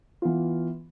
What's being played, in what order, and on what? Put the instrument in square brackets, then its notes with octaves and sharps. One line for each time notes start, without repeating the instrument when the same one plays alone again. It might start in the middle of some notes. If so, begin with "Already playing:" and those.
[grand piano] E3 B3 F4